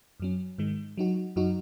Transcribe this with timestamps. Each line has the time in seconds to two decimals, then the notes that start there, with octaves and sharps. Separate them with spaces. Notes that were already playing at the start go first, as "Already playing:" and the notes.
0.20 F#2 F#3 C#4
0.58 G#2 D#3 G#3
0.97 F#3 D#4 F#4
1.36 F#2 F#3 D#4 F#4